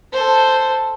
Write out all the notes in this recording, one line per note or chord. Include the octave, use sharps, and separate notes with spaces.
A4 C5